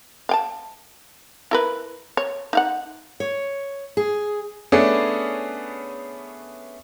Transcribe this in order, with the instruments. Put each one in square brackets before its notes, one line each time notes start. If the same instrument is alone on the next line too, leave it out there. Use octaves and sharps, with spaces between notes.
[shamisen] F5 G5 A5
E4 A#4 B4
C#5
D#4 F5 F#5
[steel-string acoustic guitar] C#5
G#4
[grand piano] A3 B3 C#4 D4 G#4